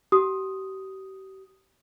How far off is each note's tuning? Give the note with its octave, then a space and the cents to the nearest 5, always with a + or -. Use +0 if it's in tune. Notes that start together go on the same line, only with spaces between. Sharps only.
G4 -40 D#6 +0